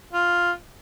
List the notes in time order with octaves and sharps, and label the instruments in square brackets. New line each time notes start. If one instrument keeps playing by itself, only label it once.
[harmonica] F4